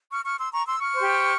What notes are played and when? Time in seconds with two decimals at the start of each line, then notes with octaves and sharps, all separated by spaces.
0.12 C#6 F6
0.25 C#6 F6
0.39 C6 E6
0.52 A#5 C#6
0.67 C6 E6
0.80 C#6 F6
0.94 G4 C5